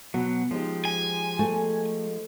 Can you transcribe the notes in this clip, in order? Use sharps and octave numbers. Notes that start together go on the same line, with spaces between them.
B2 F#3
F3 G#3 D#4 G4
G#5
A3